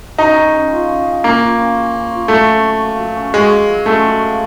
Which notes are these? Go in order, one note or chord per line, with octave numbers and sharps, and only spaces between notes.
C#4 D#4
G#4
C#4
F4
C#4
G#4
A#3 C#4
F4
C#4
G#4
C#4
F4
F#3 A3
C#4
F#4
A#3
F#3
C#4
G#3 F#4
A#3
F#3
A3 C#4
F#4
A#3